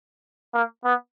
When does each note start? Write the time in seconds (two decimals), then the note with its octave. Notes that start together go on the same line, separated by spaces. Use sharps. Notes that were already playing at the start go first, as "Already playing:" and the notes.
0.54 A#3
0.84 B3